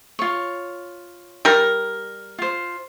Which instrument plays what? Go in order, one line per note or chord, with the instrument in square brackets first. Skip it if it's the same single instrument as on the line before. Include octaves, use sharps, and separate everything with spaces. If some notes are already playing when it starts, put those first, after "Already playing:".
[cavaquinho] F4 C#5
[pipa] G3 A#4
[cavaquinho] F4 C5